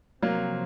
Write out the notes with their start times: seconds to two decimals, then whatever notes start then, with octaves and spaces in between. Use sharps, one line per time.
0.22 C3 F3 F#3 A#3 C4